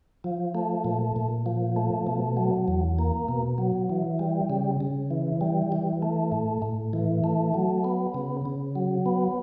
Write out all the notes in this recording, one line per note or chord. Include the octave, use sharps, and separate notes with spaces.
F3
A3
A#2
A#2
F3
A3
B2
F#3
E2
A#3
B2
F#3
E3
G3
C#3
C#3
E3
G3
E3
A3
A2
A2
E3
A3
F#3
B3
C#3
C#3
F#3
B3